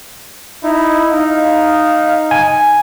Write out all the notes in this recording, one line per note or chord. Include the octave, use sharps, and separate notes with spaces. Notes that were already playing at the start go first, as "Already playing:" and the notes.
D#4 E4
D#4 F5
G#5